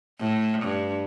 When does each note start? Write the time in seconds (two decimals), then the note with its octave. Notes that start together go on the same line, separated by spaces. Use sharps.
0.19 A2
0.63 G2